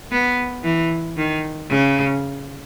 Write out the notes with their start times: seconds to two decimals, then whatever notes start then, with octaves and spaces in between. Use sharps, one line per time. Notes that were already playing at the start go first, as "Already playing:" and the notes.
0.11 B3
0.64 E3
1.17 D#3
1.70 C#3